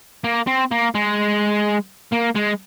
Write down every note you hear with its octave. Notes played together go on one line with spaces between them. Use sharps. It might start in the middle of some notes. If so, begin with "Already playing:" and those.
A#3
C4
A#3
G#3
A#3
G#3